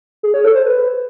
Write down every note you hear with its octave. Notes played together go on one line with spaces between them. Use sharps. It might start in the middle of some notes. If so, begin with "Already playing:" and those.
G#4
C#5
A4
C5
B4